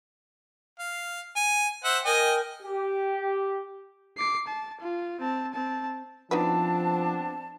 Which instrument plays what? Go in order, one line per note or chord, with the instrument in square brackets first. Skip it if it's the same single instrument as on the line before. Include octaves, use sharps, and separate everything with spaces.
[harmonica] F5
G#5
C5 E5 F#5
[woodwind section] A#4 G5 [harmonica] D#5 G#5
[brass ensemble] G4
[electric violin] D6 C7
A5
F4
C4 A5
C4 A5
[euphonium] F3 [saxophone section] B3 C4 D4 [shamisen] D#4 F#4 B4 [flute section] A5